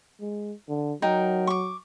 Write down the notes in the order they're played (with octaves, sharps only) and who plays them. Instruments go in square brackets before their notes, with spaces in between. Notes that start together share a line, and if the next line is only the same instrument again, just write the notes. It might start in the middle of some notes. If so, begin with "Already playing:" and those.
[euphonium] G#3
D3
[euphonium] F#3 [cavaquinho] D#4 A#4 G5
[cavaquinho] C#6 D6